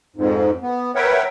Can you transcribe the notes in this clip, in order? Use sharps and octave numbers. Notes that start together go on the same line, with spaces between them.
F2 G#2
B3
A#4 B4 C#5 E5 F#5 G5